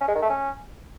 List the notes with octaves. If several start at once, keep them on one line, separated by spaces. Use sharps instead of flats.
C#4
G#3
D#3
A3
C#4